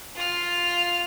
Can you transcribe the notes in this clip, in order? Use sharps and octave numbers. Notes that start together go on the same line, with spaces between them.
F4 F6